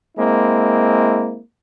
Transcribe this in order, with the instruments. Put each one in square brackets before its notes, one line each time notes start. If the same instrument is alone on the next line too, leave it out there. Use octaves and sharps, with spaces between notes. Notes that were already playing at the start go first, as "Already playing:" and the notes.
[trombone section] G#3 A#3 C4 E4